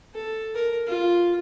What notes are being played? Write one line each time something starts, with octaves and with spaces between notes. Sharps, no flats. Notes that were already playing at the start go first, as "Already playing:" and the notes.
A4
A#4
F4